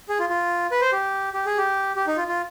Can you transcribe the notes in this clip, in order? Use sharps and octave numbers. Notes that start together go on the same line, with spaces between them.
G#4
F4
F4
B4
C5
G4
G4
G#4
G4
G4
D#4
F4
F4